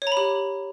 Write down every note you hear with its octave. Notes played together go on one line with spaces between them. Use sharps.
C#5
A#5
B5
G4